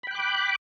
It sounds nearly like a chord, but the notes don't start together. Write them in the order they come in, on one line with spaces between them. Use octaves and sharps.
B5 G5 F#6 D6